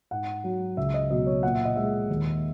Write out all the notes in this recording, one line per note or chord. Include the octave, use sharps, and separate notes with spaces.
G#2 F#5
F#3
C#2 E5
D#5
B2 F#3 D#5
C#5
A#2 F#5
E5
D#5
G#3 E5
D#2